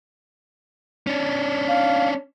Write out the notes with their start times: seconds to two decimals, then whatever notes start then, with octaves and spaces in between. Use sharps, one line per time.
1.07 C#4 D4
1.68 F5